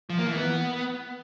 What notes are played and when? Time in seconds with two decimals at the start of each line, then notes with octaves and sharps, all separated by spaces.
0.10 F3
0.18 A#3
0.27 E3
0.36 B3